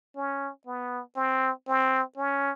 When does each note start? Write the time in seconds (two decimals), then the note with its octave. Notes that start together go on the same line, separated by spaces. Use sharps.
0.16 C#4
0.67 B3
1.16 C4
1.67 C4
2.17 C#4